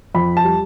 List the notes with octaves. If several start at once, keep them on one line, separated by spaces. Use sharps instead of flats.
F2 B5
A5
G3